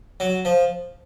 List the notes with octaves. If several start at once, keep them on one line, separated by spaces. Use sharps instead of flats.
F#3
F3